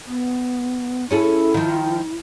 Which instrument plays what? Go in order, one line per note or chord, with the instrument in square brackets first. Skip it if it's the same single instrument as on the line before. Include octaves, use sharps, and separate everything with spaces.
[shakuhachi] B3
[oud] C#4 G#4 A4 [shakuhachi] E4
[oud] D#3 F3